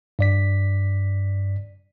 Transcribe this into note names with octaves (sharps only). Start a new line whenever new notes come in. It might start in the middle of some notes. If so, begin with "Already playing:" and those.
G2 D5 B6